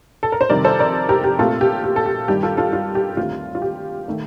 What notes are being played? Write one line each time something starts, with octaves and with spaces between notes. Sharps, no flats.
A4
A#4
C5
F2 C3 D#3 G3 A#4 D5
A4 C5
A#4 D5
G4 A#4
G4
A#2 A3 C4 F4 A4
G4
G4
A4
G4
G2 D#3 G3 G4
F4 A4
F4 A4
F4
G4
D#2 D3 A3 C4 F4
F4
G4
D#3 A3